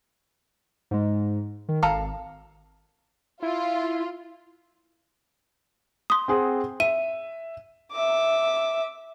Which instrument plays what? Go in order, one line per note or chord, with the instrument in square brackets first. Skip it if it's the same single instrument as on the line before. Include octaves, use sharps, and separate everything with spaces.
[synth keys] G#2 G#3
D#3
[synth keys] G#1 [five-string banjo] A4 F5 A#5
[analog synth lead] E4 [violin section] F4
[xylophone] C6 D#6
[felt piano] C4 G#4 F#5
[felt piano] E5 [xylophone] D#7
[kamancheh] E5 D6